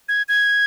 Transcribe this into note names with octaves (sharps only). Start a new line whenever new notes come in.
G#6
G#6